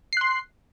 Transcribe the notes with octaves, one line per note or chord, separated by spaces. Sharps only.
C6 F#6 C7